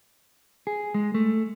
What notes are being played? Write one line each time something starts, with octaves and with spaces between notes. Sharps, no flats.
G#4
G#3
A3